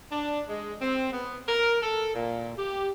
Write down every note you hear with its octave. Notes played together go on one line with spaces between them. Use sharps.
D4
G#3
C4
B3
A#4
A4
A#2
G4